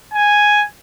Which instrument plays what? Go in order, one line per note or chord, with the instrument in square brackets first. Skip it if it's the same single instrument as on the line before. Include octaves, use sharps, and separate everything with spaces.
[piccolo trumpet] G#5